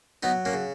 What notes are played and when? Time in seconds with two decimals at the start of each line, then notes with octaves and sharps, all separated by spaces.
0.23 F#3 B3 D#4
0.45 A#3 C#4
0.53 C#3